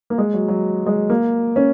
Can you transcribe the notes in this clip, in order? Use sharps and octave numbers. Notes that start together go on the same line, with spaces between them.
A#3
G#3
F#3
F#3
G#3
A#3
C#4